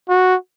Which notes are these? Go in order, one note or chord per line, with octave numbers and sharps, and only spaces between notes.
F#4